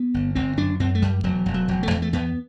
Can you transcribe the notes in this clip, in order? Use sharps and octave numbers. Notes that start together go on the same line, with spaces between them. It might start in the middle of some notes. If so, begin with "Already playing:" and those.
Already playing: B3
G1
G1 C4
F#2 D4
F#2 C4
A3
F#2 G3
E1 F#3
E1
F#3
E1
A3
E2
A3
E2 B3